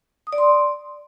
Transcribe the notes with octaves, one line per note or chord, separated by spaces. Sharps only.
D#6
D5
C6